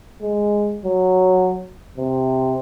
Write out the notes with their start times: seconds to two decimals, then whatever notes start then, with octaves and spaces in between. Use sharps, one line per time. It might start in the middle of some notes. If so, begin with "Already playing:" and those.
0.22 G#3
0.85 F#3
1.97 C3